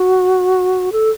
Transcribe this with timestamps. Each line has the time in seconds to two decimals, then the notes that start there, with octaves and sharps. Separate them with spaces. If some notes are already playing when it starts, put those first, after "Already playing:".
Already playing: F#4
0.92 A4